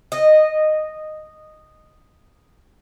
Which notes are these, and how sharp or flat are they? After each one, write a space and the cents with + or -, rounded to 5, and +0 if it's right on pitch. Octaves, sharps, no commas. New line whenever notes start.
D#5 -10